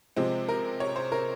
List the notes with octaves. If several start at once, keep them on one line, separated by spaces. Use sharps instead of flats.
C3 F3 G#3 C4
A#4
C#5
C5
A#4